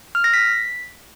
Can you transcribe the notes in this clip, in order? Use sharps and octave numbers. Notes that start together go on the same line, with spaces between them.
F6
A#6
B6